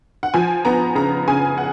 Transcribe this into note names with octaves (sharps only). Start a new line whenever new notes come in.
F#5
F3 G#5
B3 A#5
C#3 A#5
C#3 G#5
F#5